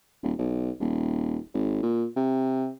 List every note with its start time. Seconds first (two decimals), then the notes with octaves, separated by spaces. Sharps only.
0.23 D#1
0.38 B1
0.80 D#1
1.54 G#1
1.83 A#2
2.16 C3